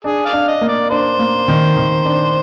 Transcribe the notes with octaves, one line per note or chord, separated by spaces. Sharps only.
D4 G#4
G#4 D5 F5
D4
D#5
A#3
D5
D4 C5
A#3
D#3
D#3
D4